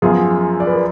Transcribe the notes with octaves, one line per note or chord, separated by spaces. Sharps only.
F#2 F3 B3 F4 G#4
D5
B4
A#4